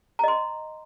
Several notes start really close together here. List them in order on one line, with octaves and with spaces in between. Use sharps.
A#5 D#5 C6